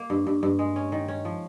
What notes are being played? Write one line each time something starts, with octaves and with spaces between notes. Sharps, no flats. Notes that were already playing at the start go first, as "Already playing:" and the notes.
Already playing: A#3
G2
G2
G2
G#3
C#4
D#3
C#4
F3